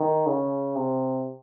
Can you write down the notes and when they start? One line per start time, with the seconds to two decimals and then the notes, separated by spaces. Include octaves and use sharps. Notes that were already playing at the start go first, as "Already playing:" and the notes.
Already playing: D#3
0.26 C#3
0.75 C3